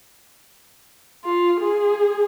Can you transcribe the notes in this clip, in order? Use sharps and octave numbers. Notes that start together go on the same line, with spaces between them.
F4
G#4